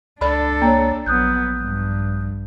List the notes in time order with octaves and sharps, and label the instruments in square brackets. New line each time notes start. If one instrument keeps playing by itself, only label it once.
[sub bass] C#2 [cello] D4 A4 [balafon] D5 B5
[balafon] A#3 [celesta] C#5 A#5
[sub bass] A#1 [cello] F#3 B3 [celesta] D#6 F#6 G6
[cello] G2